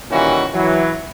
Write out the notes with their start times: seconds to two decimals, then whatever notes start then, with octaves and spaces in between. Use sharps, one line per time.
0.11 A#2 D#3 E3 G3 C#4 F#4
0.53 E3 F#3